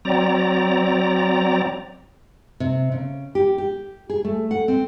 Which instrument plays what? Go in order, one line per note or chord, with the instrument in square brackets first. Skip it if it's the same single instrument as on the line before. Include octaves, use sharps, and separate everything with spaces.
[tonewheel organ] F#3 C4 D5 A#5
[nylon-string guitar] C3
C#3
G4
G4
G#4
A3
F#5
C4